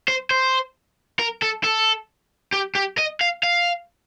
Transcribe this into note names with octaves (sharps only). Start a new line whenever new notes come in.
C5
C5
A#4
A4
A4
G4
G4
D#5
F5
F5